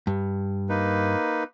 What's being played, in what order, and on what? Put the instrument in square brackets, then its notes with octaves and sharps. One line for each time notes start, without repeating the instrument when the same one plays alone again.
[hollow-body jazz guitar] G2
[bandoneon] A#3 D#4 B4